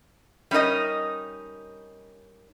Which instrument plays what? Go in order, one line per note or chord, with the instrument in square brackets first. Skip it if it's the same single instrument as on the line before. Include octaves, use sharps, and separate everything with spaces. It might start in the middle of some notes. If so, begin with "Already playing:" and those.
[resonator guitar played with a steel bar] G3 C#4 D#4 A#4 D#5